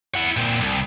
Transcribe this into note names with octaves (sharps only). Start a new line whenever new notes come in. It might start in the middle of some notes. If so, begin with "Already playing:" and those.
E4 F#5
A#2 C4
C2